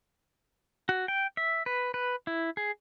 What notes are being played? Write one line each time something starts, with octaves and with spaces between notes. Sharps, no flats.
F#4
G5
E5
B4
B4
E4
G#4